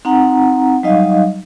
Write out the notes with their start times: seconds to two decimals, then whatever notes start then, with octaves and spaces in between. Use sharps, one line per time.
0.05 C4 D#4 F#5 A#5
0.83 F#3 G3 D#4 D#5 F5